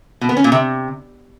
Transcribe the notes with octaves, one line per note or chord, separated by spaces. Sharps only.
B2
B3
C#4
A#2
C3